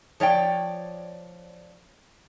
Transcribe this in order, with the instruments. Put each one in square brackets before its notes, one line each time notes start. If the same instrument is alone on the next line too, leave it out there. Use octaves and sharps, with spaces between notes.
[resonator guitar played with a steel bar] F3 C#5 D5 G5